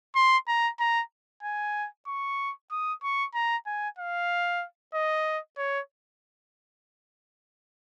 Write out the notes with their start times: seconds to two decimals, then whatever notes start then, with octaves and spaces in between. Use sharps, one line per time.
0.15 C6
0.48 A#5
0.80 A#5
1.43 G#5
2.07 C#6
2.71 D#6
3.03 C#6
3.34 A#5
3.66 G#5
3.98 F5
4.94 D#5
5.58 C#5